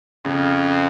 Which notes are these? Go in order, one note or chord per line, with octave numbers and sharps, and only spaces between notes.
F2 C#3